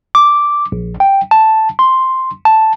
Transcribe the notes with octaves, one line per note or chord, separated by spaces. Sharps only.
D6
A#1
G5
A5
C6
A5